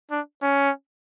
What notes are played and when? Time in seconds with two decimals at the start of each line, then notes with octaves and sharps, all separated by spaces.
0.11 D4
0.42 C#4